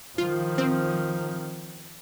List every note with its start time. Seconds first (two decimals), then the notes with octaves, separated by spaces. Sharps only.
0.18 D#3 F3 F4
0.58 C4